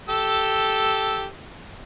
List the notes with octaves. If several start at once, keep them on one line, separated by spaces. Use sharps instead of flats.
G4 A4 E6